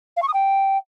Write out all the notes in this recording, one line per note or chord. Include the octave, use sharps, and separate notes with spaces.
F5
C#6
D#6
G5